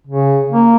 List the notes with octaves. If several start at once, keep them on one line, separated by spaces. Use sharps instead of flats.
C#3
A#3